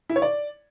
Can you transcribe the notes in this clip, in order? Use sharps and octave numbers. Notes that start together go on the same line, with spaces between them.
E4
C#5
D5